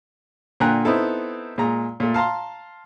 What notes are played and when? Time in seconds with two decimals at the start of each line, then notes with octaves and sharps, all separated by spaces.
0.60 A#2 D3 G5 G#5 A#5 F#6
0.85 B3 C4 D#4 E4 A4
1.58 A#2 G#3 A#5
2.00 A#2 A3
2.14 F5 A5 A#5 C6